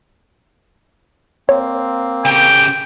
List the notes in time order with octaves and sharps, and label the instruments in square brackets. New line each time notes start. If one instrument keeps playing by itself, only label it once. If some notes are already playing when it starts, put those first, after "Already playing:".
[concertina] A#3 C4 [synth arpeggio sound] C#5
[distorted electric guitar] C#3 G4 [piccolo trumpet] G5